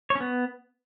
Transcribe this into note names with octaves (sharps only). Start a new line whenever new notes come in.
C#5
C#4
B3